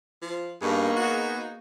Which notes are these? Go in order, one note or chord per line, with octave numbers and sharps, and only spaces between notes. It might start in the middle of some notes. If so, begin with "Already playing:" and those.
F3
G2 A#3 B3 D#4 G#4 C#6
F#4